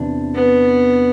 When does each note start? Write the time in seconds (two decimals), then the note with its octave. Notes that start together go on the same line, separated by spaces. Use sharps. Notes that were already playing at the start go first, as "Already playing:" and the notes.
Already playing: E2 C3 D4
0.35 B3